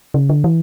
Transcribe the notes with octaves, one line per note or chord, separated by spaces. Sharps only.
C#3
D3
E3